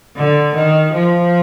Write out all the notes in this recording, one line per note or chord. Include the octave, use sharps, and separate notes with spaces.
D3
D#3
F3